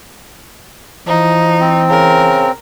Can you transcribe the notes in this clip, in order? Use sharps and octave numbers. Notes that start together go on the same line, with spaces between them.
E3 F3 D#4
C4
C#3 A#4